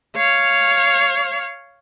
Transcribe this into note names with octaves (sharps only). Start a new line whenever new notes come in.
C#5 F5